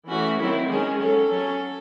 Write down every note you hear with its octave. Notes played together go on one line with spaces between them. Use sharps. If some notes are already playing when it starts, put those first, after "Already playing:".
E3 A3 C#4 F#4
D#3 F#3 C4 E4
D#3 G#3 C#4 G#4
F#3 C#4 A4
F#3 C#4